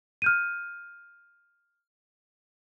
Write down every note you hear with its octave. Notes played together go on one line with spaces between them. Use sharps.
F6 G6 D#7